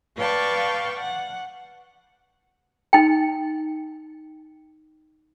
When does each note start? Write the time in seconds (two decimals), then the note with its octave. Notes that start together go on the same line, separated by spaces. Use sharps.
0.17 B4 D5 F5 G5 A5 C#6
0.98 F#5
2.93 D#4 G5